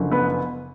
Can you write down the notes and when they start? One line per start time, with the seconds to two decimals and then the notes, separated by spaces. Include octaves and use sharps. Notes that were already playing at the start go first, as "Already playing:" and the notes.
Already playing: F#1 F#2 D3 F3
0.11 B3 B4